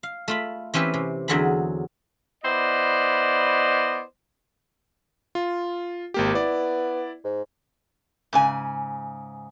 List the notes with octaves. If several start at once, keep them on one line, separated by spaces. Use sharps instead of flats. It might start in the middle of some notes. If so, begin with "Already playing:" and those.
F5
A3 F4 B5
E3 C4 C#4 G4 B4
C3
E2 D3 F#3 C4 G#4 B5
B3 E4 C5 D5 D#5
F4
G#1 A#3 G4
B3 E4 D5
G#2
G#2 C#3 G#5